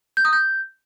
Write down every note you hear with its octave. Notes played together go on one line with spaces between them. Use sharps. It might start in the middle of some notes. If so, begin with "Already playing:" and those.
G6
D#6
G6